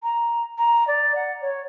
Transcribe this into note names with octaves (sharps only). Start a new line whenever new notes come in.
A#5
A#5
D5
F#5
C#5